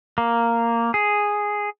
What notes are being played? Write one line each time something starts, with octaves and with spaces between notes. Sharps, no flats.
A#3
G#4